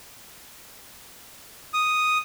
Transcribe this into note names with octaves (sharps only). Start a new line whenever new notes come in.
D#6